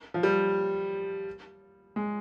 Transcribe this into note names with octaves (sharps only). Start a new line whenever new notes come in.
F3
G3
G#3